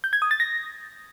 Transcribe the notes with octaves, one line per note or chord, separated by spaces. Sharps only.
G6
G#6
D#6
A6
A#6